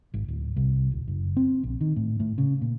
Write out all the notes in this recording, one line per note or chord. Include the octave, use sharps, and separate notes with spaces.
G#1
D1
C2
D#1
F#1
C4
A#1
D#3
A2
A2
C#3
A#2